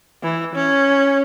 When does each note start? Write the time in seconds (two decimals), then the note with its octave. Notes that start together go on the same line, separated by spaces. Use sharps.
0.23 E3
0.55 C#4